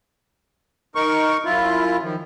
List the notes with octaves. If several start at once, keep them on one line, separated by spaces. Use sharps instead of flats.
D#4 A#4 C#6
F#2 E4 F4
D#3 F3